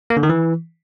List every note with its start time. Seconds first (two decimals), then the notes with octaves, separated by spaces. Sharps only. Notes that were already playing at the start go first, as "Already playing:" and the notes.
0.10 A#3
0.17 D3
0.23 D#3
0.30 E3